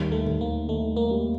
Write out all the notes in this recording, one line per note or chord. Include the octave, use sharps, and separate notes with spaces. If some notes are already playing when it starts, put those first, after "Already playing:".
Already playing: D#2 G3
A3
D#2
A#3
D#3 A3
A#3
G3